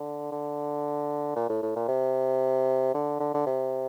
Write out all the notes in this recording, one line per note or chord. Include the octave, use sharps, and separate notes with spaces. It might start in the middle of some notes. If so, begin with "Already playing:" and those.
Already playing: D3
D3
A#2
A2
A2
A#2
C3
D3
D3
D3
C3